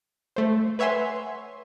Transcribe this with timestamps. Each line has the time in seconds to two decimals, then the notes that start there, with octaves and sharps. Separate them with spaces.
0.36 A3 C5
0.79 B4 C#5 E5 F#5 G#5 C6